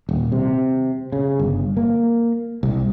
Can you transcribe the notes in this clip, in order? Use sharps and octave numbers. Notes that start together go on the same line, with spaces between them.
D#1
C3
C#3
G1
A#3
C2